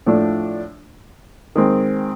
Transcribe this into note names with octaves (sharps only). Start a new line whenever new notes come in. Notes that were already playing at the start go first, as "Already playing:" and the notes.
A2 F3 A3 D4
D#3 G#3 C4